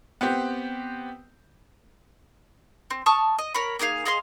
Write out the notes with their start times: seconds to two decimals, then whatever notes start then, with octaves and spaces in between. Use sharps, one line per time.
0.21 B3 C4 G4
2.90 C4
3.06 A5 C#6 D#6 F6
3.38 D#5
3.55 A#4 C#5 B5
3.79 A#3 D#4 G#4 F5
4.06 G#4 D#5 F5 C6